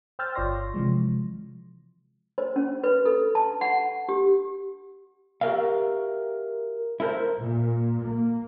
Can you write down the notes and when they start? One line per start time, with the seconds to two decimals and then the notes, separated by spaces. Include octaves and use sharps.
0.19 C5 G5 E6 F6 G6 A6
0.35 G1 F4 C#5 D5 C6 A#6
0.74 C3 E3 F3 G#3
2.38 C5
2.56 C#4
2.84 B4
3.05 A4
3.35 A5
3.61 F#5
4.09 G4
5.41 F#4 G4 A4 A#4 E5 F5
7.00 E4 A4 A#4 C5
7.39 A#2
8.02 A#3